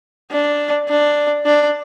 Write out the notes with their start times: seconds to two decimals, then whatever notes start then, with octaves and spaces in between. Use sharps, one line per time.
0.31 D4
0.89 D4
1.45 D4